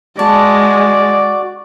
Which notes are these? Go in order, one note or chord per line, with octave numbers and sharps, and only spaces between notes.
G#3 F#4 D5 A5